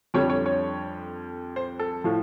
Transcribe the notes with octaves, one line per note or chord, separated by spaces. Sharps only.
F2 D3 G3 C#5
C#5
C#5
C5
A4
A2 F3